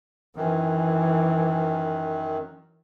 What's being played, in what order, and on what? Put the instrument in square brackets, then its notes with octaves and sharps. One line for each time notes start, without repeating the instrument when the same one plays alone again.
[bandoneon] F#2 D#3 [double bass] E3